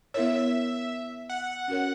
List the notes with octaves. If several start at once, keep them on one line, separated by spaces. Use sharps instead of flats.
B3 E4 A#4 C#5 E5
F#5
C#4 F#4 A#4 C#5